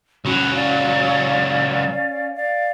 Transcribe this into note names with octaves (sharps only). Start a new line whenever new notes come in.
C#2 F#3 C#4 F#4 B5
C#4 D5 F5
D5 F5